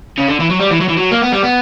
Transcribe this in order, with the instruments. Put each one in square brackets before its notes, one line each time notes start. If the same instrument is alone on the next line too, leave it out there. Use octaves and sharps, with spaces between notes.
[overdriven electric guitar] C#3
D3
E3
F#3
G3
E3
F#3
E3
F#3
A#3
B3
G3
B3